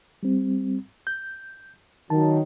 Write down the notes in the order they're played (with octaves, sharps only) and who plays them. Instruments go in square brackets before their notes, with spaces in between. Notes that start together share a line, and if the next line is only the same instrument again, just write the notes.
[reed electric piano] G3 C4
G6
[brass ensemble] D#3 F#3 [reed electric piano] A5